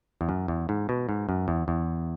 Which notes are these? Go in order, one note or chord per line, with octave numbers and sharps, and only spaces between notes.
E2
F#2
E2
G#2
B2
G#2
F#2
E2
E2